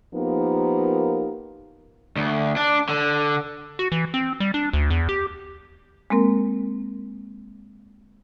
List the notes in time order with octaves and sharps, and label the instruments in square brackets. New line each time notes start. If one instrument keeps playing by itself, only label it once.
[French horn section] F3 A#3 B3 D#4 G4 A#4
[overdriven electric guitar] D2
D4
D3
[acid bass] F#4
E3
C4
G3
D4
D2
E2
G4
[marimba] G#3 A#3 C4 A#4